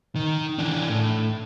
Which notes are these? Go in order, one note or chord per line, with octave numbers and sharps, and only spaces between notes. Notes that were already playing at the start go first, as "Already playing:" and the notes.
D#3
E3 D4
A2